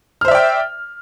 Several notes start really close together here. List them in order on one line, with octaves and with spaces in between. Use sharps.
F6 C5 E5 D5 G5